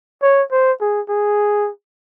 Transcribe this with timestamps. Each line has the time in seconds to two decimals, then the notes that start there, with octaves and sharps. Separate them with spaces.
0.22 C#5
0.52 C5
0.81 G#4
1.09 G#4